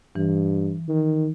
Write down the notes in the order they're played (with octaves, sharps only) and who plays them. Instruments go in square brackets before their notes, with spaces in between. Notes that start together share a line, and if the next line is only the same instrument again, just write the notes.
[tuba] G2 [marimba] E3
[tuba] D#3